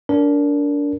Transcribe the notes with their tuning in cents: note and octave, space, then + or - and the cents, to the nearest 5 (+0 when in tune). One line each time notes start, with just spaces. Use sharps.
D4 -25 A#4 +0